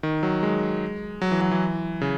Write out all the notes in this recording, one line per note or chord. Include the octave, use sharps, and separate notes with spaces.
D#3
F#3
G#3
F#3
E3
F#3
E3
C#3